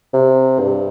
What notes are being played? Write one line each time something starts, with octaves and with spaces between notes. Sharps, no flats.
C3
G2